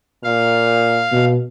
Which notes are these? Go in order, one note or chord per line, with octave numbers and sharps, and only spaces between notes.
A#2 F5
B2